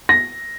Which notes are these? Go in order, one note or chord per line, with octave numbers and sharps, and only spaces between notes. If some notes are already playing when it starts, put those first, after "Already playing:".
A#6